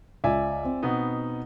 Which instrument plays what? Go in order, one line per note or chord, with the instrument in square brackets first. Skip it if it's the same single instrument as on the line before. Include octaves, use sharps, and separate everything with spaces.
[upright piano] C#2 [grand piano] D5 E5 G#5
[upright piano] C4
[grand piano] B2 B3 D#4